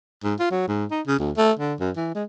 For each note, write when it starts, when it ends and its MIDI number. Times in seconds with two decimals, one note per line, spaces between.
0.23 0.34 44
0.39 0.47 65
0.51 0.66 54
0.68 0.85 44
0.91 1.01 63
1.07 1.17 49
1.19 1.31 38
1.37 1.52 57
1.59 1.74 50
1.80 1.91 42
1.96 2.10 52
2.15 2.24 56